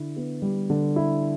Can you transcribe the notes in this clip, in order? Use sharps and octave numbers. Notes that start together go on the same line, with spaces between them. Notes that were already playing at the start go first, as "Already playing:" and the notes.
Already playing: D3 E4
B3
G3
D3
E4